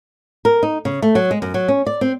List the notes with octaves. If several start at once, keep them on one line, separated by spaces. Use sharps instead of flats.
A#4
D#4
C#3
A3
F#3
G#3
F#2
F#3
C#4
D5
C4